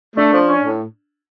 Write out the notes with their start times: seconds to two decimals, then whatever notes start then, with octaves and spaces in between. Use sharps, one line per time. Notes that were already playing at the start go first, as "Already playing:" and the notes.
0.16 A3 D4
0.33 F3
0.48 C#4
0.63 A2